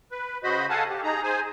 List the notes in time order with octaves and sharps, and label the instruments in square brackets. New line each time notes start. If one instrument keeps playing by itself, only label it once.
[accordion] B4
C#3 F#4 C5 D#5 B5
A4 F5 F#5 G#5 A5
G4
D#4 G#4 A#5
G#4 C5 G#5